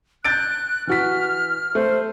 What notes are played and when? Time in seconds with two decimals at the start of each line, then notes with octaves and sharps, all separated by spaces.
0.25 F#6 G6 A6 D7
0.87 E3 F#4 F6 B6
1.75 A3 C5